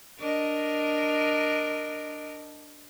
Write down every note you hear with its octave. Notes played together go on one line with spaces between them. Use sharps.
D4 A#4 D#5